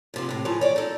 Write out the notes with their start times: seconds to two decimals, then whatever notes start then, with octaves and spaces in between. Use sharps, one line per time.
0.14 G#2 C3 F3
0.29 A2 C3
0.45 E3 F3 A3 G#4 A#5
0.61 C#5 D5
0.76 D#4 A4